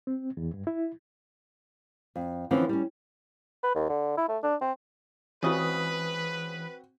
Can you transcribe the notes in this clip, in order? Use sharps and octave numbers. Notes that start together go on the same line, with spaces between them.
C4
E2
G2
E4
F2
D3 E3 F3 C4 C#4
G3 C#4
B4
D#2
D3
E4
A3
D4
C4
C#2 C#3 E3 C4 F#4 B4 D#6